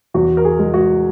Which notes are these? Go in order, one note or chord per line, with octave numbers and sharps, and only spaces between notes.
E2 F#4
A#4
G#4
G#3
F#4